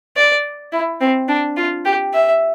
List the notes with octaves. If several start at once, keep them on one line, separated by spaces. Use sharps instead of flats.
D5
E4
C4
D4
F4
G4
E5